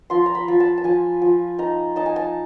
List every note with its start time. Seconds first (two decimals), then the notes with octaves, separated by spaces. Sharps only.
0.10 F3 C6
0.26 A#5
0.35 B5
0.48 F3
0.60 A5
0.78 A5
0.84 F3 G#5
1.22 F3
1.58 D#4 A#5
1.96 D#4 A5
2.06 G#5
2.16 A5